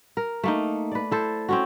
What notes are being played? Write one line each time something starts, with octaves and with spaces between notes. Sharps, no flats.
A#4
A3 A#3 D#4
B4 D5
E4 A4 C5
C4 C#4 F#4